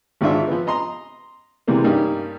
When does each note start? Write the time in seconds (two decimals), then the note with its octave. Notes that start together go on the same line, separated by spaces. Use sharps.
0.21 G#1 G#2 D4 F4 E5
0.47 F3 B3
0.67 D#5 A#5 C6
1.68 C3 E3 G3 G#3 A#3
1.84 G2 G3 A#3 C#4 D#4